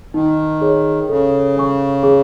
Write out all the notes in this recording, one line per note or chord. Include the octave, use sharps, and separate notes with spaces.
D#3 D#4
G#4 C#5
C#3 A4
C#5 G#5 C#6
G#4